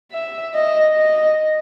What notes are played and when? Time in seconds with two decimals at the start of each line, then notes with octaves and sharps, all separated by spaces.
0.12 E5
0.54 D#5
0.97 D#5